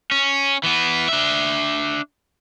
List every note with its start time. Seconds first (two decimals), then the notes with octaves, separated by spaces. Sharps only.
0.11 C#4
0.64 E3 B3
1.08 D4 E5